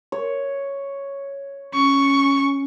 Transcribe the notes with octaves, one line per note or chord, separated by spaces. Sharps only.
C#5
C#4 C#6